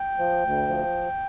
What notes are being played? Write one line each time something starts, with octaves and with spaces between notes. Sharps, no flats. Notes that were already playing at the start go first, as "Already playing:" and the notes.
Already playing: G5
F3
D2
F3